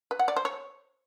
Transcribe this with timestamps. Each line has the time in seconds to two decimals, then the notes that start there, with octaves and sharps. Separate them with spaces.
0.11 B4
0.19 F#5
0.28 D5
0.36 C5
0.45 C#5